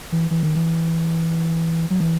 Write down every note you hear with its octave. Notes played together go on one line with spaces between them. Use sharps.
E3
E3
D#3
E3
F#3
E3